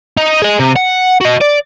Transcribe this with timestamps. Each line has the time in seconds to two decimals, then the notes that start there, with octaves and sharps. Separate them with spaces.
0.17 D#4
0.42 G#4 D#5
0.59 C3
0.76 F#5
1.21 F#4 D#5
1.41 D5